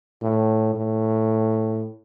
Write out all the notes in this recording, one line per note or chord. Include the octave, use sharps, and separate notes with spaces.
A2
A2